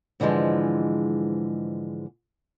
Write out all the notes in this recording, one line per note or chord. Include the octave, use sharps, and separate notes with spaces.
G#2 D3 E3 F3 G#3